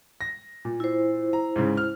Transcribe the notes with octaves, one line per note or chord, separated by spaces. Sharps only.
A#6
A#2
E4 C5
A#5
G#2 C#3
F6